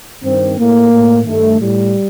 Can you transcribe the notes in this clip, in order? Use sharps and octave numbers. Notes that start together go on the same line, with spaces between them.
G2 D#3 C4
A2 A#3
A2
G2 D#3 A3
A2 G3